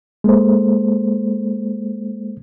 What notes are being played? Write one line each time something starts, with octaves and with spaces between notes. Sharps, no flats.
G#3 A#3 A4 C5